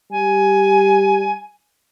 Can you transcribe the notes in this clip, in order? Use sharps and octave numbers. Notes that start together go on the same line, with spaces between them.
G3 G#5